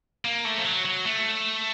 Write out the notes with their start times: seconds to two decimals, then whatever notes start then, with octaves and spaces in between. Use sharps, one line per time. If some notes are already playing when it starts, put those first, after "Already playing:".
0.25 A#3
0.45 A3
0.58 F3
0.65 F#3
0.85 F#3
1.05 A3